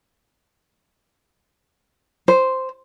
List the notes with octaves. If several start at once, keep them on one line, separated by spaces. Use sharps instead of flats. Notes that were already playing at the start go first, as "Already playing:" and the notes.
C5